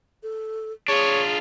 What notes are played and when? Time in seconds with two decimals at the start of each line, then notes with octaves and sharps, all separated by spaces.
0.23 A4
0.88 D4 F4 G#4 C#5